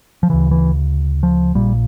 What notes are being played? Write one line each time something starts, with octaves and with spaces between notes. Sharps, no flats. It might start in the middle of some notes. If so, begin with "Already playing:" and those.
F3
D2 C#3 E3
E3
F3
A#1 A#2 G3